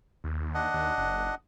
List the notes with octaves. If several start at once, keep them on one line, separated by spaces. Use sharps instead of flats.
D#2
D4 D#5 F#5
D#2
F#1